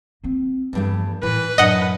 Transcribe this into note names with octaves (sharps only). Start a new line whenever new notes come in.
A#3 C4
E2 G2 F3 A3
A2 E3 B4
F#2 A2 D4 D#5 F#5